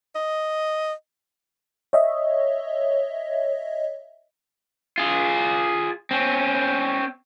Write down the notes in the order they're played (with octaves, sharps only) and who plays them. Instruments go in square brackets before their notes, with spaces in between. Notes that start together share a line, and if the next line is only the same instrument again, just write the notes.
[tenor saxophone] D#5
[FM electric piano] C#5 D#5 E5
[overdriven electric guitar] F4 G#4
C4 C#4